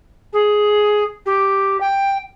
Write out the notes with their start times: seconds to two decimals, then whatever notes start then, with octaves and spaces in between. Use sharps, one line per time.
0.33 G#4
1.26 G4
1.80 G5